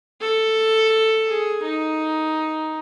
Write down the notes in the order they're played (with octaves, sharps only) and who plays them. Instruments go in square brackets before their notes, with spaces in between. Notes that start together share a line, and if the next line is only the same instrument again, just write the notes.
[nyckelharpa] A4
G#4
D#4